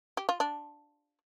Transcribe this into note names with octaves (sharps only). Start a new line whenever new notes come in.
G4
F4
D4